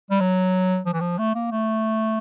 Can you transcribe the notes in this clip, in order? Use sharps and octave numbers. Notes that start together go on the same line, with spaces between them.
G3
F#3
F3
E3
F3
A3
A#3
A3